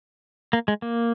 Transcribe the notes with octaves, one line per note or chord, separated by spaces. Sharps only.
A#3
G#3
A#3